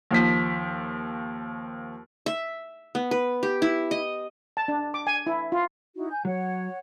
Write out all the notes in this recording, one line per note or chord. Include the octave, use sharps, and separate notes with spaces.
D#2 F3 B6
E5
B3
B4
G4
E4
D#5
A5
D4
D6
G#5
E4
F4
D#4 E4 F#4
G#5 G6
F#3 C#5 F#5